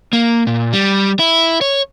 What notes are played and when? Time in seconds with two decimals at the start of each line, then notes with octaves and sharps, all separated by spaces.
0.13 A#3
0.47 A#2
0.73 G3
1.19 E4
1.61 C#5